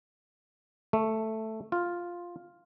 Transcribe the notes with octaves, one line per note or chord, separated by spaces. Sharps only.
A3
F4